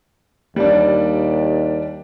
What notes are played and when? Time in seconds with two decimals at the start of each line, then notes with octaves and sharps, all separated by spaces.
0.56 D#2 G3 D4